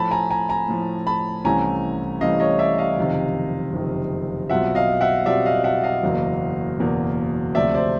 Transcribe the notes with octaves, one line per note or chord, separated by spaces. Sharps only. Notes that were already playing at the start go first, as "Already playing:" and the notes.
Already playing: A2 F3 A3 A5 B5
G#5 A#5
G#5 A#5
G#5 A#5
A2 F3 A3
A5 B5
C2 C3 E3 A3 C#4 G#5 A#5
C2 C3 E3 A3 C#4 D#5 F5
C#5 D#5
D5 E5
D#5 F5
F#1 F2 C3 D#3
F#1 F2 C3 D#3
B1 B2 G3 C4 F4 E5 F#5
D#5 F5
E5 F#5
B1 B2 G3 C4 F4 D5 E5
D#5 F5
E5 F#5
D#5 F5
F#1 E2 B2 F#3 A#3
F#1 E2 B2 F#3 A#3
D2 C3 F3 A3 C4 D5 E5
C5 D5